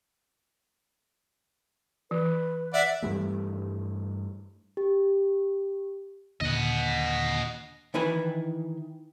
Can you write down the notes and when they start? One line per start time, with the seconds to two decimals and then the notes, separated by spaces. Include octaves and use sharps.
2.11 E3 B4
2.74 D5 E5 F#5
3.02 G2 E3 G3 A3
4.77 G4
6.41 D#2 A#2 D3 D#5 F#5
7.94 D#3 E3 E4 B4 G#5 B5